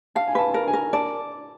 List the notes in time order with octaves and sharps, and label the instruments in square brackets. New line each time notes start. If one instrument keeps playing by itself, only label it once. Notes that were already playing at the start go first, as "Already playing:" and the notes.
[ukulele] F5 [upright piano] A5
[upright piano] G#5
[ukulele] B4 [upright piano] A5
[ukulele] A#4 [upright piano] A5
[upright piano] G#5
[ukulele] A#4
[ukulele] D5 [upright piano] A5